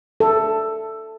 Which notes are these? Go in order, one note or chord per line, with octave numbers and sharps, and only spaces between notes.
A4